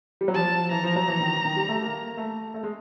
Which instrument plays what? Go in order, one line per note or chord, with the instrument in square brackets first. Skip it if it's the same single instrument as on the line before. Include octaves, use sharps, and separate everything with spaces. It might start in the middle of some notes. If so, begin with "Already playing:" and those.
[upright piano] G3
F#3
[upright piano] F3 [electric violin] A5
[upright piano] E3 [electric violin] A#5
[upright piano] F3
F#3
E3
D#3
D#3
G3
A3
A#3
A3
A3
G#3